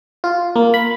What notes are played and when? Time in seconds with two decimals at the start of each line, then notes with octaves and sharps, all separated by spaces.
0.24 F4
0.56 A#3
0.74 B5